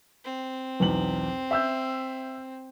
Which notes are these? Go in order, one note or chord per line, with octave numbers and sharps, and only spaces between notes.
C4
B1 E2 F#7
E5 E6 G6